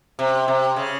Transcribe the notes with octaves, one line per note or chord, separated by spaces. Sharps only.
C3
C3
C#3